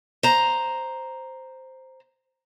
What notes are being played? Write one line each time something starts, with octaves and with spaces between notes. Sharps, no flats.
C5 A#5